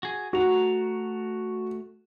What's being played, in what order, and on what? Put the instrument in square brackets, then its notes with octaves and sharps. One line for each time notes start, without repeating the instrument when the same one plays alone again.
[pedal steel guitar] F#4 G#4
[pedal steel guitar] A3 A#5 [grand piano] F#4